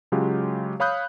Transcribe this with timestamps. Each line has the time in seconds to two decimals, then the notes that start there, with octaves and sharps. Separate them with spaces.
0.12 C#3 F#3 G#3 F4 G4
0.80 C#5 F5 B5 D#6 F#6 G6